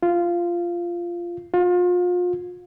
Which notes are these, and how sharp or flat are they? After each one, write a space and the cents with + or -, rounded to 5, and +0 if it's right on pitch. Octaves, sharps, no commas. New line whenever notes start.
F4 -10
F4 +35